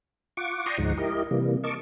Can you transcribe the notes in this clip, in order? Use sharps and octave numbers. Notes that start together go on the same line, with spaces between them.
F4 F#5 C#6 D6
D5 G5 A#5 C6 C#6 D#6
D2 G#2 F3 G#3 D#4 F#5
E4 G4 A#4 D#5
C3 E3 G3 A#3
A#4 D#5 A5 C#6 D6